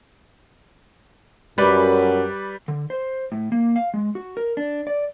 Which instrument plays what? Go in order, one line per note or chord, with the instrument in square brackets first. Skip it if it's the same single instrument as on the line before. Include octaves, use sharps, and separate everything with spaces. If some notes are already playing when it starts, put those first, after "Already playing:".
[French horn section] F#2 [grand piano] G3 B4 D5
[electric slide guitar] D3
C5
A2
A#3
F5
G#3
F#4
A#4
D4
D5